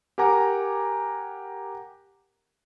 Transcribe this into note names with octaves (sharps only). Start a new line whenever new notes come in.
G4 A#4 F#5 G#5 A#5 D6